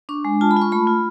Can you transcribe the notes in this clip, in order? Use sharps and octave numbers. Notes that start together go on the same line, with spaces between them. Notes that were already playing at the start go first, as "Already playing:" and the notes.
D4 C#6
G#3
F4 A5
B5
F4
C#6
A3 B5
F4